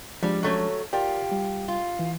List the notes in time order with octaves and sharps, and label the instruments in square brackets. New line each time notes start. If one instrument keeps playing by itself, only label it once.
[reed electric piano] F3 G#3 D4 [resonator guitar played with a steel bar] G3
[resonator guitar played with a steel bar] F#3 A3 C#4
[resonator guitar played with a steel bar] F4 G4 [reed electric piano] A#4 D5 G5
[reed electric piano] G3
[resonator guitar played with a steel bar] F4
[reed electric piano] E3